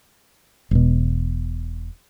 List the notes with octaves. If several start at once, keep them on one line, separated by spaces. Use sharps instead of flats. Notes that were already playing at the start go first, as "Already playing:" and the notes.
E1 B2